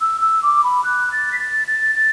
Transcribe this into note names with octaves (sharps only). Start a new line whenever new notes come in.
E6
E6
D6
B5
F#6
A6
B6
A6
A6
A6